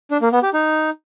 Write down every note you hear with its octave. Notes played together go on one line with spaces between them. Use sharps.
D4
A#3
B3
G4
D#4